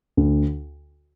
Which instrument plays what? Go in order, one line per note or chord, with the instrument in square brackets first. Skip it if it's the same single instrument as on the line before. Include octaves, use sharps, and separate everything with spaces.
[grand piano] D2